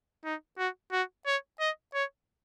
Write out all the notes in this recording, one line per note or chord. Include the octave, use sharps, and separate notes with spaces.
D#4
F#4
F#4
C#5
D#5
C#5